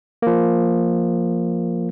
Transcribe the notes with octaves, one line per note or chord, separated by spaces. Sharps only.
F3 A#3